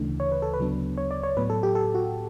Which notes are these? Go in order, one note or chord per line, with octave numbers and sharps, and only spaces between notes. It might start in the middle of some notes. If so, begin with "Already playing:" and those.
Already playing: D2 C#3 E3 A3 D4
C#5
B4
A4
B4
D2 C#3 F#3 B3 D4
C#5
D5
C#5
A2 F#3 B3 B4
A4
G4
A4
F#4